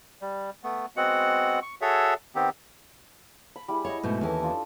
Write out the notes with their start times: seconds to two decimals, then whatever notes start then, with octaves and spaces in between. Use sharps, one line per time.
0.21 G3
0.64 A3 B3
0.97 G#3 B3 C4 F#4 F#5
1.63 C#6
1.81 F#4 G#4 A4 C#5 E5
2.35 D#3 B3 C4 G4
3.56 B5
3.68 G3 E4 G#4
3.85 C#5 D#5 E5 F#5
4.03 G#2 B2 A3
4.21 D#2 E3 C#4 G4 A4
4.43 D4 F4 A5